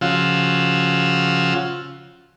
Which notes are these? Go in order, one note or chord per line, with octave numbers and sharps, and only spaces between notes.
C#3 F3 F4 F#4 E6